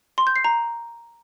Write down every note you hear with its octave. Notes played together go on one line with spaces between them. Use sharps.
C6
G6
C7
A#5